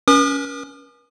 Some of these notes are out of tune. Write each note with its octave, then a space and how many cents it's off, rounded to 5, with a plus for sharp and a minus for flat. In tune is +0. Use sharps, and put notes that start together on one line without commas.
C#4 +15 B4 -45 D#6 -40